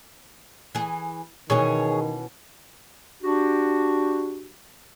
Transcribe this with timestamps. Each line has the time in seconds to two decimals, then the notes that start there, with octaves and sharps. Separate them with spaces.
0.75 E3 G#4
1.50 B2 D#3 E3 C#4 G#4 C#5
3.22 D4 F#4 G4